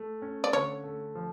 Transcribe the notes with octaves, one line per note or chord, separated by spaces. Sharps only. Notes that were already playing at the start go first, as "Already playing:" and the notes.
Already playing: A3
C#4
D5
D3 C#5
A3
F3